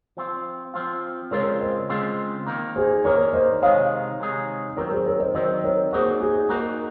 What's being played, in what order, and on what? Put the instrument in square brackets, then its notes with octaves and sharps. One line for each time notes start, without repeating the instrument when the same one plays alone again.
[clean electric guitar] F3 C4 F4
F3 C4 F4
[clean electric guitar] C#3 G#3 C4 F4 [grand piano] A#4 C#5
[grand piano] C5 D#5
[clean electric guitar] C#3 G#3 C4 F4
D#3 A#3 D#4
[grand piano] G#4 C5
[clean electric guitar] D#3 A#3 D#4 [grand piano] A#4 C#5
[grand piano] C5 D#5
[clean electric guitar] C3 D#3 G#3 D#4 G#4 [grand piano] C#5 F5
[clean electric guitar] C3 D#3 G#3 D#4 G#4
[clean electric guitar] D#3 F#3 C4 [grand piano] A#4
[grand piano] G#4 C5
A#4 C#5
C5 D#5
[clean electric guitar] D#3 F#3 C4 [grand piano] C5 D#5
[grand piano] A#4 C#5
[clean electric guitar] A#3 D#4 F#4 [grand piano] G#4 C5
[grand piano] G#4
[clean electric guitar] A#3 D#4 F#4 [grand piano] A#4